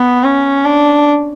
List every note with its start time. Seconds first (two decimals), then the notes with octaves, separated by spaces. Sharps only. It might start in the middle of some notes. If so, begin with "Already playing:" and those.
Already playing: B3
0.24 C#4
0.65 D4